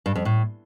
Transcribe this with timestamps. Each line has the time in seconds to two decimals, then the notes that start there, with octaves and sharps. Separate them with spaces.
0.06 G2
0.15 F2
0.25 A2